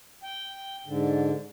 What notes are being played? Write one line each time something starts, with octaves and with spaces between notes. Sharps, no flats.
G5
G#2 D3